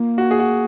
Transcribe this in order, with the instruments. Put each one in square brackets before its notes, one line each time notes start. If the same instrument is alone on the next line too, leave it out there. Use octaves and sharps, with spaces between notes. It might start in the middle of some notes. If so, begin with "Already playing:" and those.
Already playing: [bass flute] A#3 [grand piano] F4
[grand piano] F#4
G#4
F#4